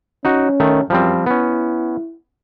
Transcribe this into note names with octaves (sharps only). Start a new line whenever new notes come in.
C#4 D#4 F#4
D#3 A3
F#2 F3 G3 C4
B3 C#4 E4